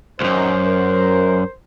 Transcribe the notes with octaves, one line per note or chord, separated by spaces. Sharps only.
C2 F#2 D#3 C5
A#4